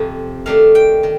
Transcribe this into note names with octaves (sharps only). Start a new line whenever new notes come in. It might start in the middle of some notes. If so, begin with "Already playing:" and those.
Already playing: F2 C3 F3
D#3 A3 D4 F5
G5
D#3